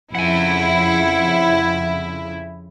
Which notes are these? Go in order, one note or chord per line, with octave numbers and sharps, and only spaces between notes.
F2 C#3 E4 F#5 G#5